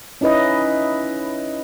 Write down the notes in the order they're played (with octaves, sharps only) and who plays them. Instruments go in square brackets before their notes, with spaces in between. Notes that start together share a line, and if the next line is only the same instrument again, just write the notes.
[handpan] C#4 D#4 E4 B4 D#5